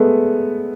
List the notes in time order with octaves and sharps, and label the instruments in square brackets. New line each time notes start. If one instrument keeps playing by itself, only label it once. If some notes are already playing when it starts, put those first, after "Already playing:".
Already playing: [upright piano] G#3 A3 B3